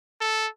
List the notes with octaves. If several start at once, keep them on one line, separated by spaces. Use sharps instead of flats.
A4